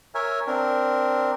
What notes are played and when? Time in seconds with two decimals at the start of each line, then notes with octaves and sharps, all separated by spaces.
0.15 A#4 C#5 E5 G#5
0.47 C4 D4 A#4